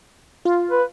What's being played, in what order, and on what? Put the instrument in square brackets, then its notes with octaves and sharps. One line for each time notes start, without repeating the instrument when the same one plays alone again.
[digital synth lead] F4
[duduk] B4